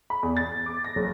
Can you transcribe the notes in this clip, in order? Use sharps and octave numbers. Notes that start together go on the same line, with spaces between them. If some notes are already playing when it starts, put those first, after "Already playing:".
B5
E2
A6
D6
A#6
F#1